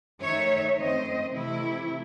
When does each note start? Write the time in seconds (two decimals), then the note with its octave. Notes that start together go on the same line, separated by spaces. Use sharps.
0.21 D#3 A3 D#4 C#5 E5
0.77 F#2 D#3 A3 C4 C5 D#5
1.33 C3 E3 A3 E4